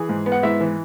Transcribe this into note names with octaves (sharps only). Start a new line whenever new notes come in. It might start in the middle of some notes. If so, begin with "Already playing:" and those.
Already playing: E3 G#4
G#2
B3
F#5
G#2 E4 E5
E3